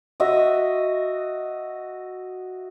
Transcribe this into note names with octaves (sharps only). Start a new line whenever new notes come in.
F#4 D#5 E5